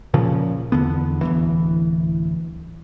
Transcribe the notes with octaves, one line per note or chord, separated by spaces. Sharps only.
A#2 C#3 F3
E2 D3 B3
D1 C2 E3